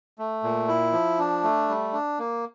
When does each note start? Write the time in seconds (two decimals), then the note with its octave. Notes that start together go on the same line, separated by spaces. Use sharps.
0.19 A3
0.43 A#2
0.68 E4
0.93 F3
1.19 D4
1.43 A3
1.69 G3
1.93 D4
2.19 A#3